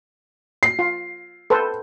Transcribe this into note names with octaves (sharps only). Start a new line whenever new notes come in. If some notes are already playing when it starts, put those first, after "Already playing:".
C7
F4
A4 B4 C5